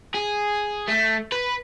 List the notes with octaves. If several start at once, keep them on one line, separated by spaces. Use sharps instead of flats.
G#4
A3
B4